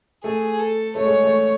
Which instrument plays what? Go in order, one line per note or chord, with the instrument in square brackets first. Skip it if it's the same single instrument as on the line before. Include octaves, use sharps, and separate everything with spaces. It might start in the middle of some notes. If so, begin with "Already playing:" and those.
[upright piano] A3 [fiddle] G#4
[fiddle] A4
[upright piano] A3 [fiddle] C#5
[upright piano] G#3
A3